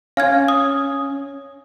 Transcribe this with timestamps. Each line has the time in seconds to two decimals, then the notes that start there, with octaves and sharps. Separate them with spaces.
0.17 C#4 F5 F6 G#6
0.48 D#6